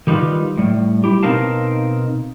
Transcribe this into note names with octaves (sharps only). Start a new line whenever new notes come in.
D#3 G3 D#4 F4 B4
A2 G3
E4 G4
B2 C4 D#4 A#4 F5 A5